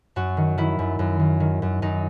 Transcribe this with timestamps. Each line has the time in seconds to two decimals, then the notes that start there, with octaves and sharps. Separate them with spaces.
0.16 F#2 F#4
0.37 D#3
0.58 D#3 E4
0.79 F#2
0.99 F#2
1.20 D#3
1.40 D#3
1.62 F#2
1.82 F#2 D#4